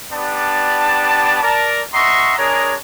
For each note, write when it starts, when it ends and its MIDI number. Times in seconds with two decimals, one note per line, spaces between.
0.13 1.40 59
0.13 1.40 62
0.13 1.40 67
0.13 1.40 74
0.13 1.40 81
1.41 1.80 70
1.41 1.80 74
1.41 1.80 81
1.93 2.35 75
1.93 2.35 76
1.93 2.35 78
1.93 2.35 82
1.93 2.35 84
1.93 2.35 85
2.36 2.73 56
2.36 2.73 62
2.36 2.73 68
2.36 2.73 70
2.36 2.73 73
2.36 2.73 82